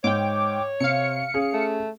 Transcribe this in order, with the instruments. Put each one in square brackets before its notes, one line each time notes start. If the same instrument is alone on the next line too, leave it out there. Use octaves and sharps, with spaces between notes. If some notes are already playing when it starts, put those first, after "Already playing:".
[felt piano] G#2 [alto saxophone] C#5 [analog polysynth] G5 D6
[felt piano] C3 [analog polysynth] F5 C#7
[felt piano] C#4 G#4
[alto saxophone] A3